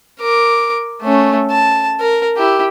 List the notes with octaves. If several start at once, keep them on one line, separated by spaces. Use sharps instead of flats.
A#4 D6
A3 C#4
A5
A#4
E4 G4